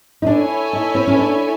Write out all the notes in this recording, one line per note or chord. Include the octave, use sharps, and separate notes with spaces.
D#4
D4 E4 A4 C#5 E5 G#5
D#4
C4
C#4
D4